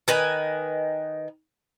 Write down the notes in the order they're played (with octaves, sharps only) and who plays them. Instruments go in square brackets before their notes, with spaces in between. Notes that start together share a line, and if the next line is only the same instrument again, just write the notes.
[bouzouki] D#3 B4 D#5 G#5